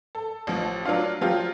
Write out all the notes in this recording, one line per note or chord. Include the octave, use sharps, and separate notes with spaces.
A4
A1 F3
F#3 D4 F4
F3 F#3 F4 G4